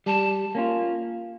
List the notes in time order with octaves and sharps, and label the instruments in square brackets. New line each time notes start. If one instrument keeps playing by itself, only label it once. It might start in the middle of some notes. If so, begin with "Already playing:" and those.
[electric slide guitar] G3 [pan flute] A5
[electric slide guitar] A#3 C#4 F4